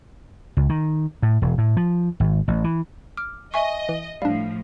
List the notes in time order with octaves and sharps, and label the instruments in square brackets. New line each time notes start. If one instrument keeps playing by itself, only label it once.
[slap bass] C#2
D#3
A2
E1
A2
F3
G#1
A1
E3
[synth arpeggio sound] D6 [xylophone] F6
[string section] D#5 [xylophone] E5 G#5 C#6
[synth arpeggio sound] E3
[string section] A2 F3 [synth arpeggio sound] G3 D4 [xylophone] F5